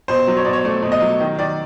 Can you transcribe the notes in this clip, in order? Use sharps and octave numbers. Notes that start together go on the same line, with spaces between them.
B2 C5
F#3
C#5
B2 D5
C#5
A3 D5
B2
D#5
F#3
D#3
D#3 D5